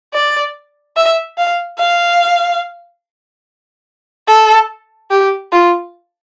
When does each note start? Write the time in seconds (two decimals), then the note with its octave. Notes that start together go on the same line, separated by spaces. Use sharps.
0.14 D5
0.96 E5
1.38 F5
1.79 F5
4.28 A4
5.11 G4
5.53 F4